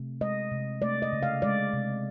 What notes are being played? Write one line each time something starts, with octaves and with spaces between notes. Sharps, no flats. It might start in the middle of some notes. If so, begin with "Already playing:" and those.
Already playing: C3 A3
G#3 D#5
C3
A3 D5
D#5
C#3
F5
G#3 D5
C3